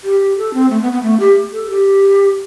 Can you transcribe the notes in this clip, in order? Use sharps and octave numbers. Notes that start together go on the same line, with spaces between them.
G4
A4
C4
A3
B3
B3
A3
G4
A4
G4